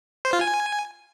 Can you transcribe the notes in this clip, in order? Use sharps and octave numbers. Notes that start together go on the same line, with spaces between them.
C5
F4
G#5